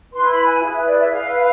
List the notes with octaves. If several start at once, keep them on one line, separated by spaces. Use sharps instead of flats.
E4 B4 C6
B5
G#5
E4 G#4 B4 F5
E5
D5
E5
E4 B4 F5
F5